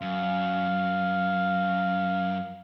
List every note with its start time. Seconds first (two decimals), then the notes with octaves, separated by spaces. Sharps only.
0.01 F#2 F5